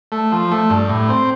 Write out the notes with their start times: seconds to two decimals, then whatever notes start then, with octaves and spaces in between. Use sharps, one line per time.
0.12 A3
0.32 F3
0.51 A3
0.70 G2
0.89 A2
1.09 C4